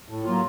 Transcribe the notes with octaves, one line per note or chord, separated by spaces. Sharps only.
A2
F#3 A#3 F4